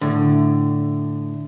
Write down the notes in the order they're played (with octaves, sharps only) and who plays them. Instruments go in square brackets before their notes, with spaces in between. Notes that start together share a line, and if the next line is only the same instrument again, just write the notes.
[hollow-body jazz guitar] A2 D3